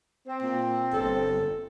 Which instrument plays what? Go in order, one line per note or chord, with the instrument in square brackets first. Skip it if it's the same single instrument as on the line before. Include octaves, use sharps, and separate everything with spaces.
[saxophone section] C4
[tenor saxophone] A#2
[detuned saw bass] G1 [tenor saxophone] A4